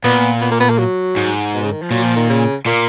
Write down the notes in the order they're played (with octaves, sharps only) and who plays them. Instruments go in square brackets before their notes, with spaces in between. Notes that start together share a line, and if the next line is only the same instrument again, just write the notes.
[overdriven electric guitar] A#2 [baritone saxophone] B3
[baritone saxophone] B3
A#3
B3
A#3
F#3
[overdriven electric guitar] G#2
[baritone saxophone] B2
C#3
D#3
F3
[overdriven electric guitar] A#2 [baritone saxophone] F#3
[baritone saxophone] F3
D#3
C#3
[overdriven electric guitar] A#2 [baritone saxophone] A#3